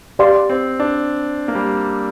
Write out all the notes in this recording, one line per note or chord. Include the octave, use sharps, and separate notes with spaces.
G4 D5 F5 C6
C4
D4
A#3
G3